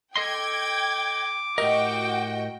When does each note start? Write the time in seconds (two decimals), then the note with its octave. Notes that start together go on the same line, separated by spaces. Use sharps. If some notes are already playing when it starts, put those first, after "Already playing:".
0.16 A4 D#5 G5 C6 D6 G#6
1.58 A2 F#4 G4 A#4 D#5 G5